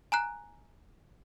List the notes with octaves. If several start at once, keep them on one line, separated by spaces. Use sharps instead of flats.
G#5 A#5 F#6